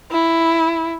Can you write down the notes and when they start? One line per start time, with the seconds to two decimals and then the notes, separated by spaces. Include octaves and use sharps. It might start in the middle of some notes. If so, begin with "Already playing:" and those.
0.11 E4